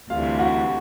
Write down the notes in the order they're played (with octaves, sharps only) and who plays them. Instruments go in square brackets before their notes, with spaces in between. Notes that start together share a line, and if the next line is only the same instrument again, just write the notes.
[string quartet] D2 C3 E3 G3 [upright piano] F4 F5
[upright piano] F#4 F#5